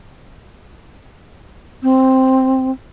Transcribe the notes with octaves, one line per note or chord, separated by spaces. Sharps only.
C4